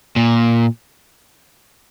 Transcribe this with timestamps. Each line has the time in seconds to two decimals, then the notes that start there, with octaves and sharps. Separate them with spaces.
0.16 A#2